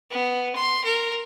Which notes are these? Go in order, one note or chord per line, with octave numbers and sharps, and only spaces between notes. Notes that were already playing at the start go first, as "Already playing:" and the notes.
B3
C6
A#4